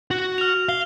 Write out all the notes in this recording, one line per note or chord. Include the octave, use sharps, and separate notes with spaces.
F#4
F6 F7
F5 G7